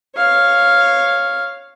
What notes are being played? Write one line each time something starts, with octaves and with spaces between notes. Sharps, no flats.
C#5 F5